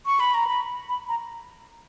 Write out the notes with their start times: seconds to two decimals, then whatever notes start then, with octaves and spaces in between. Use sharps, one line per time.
0.06 C#6
0.20 B5
0.34 A#5
0.47 B5
0.89 B5
1.09 A#5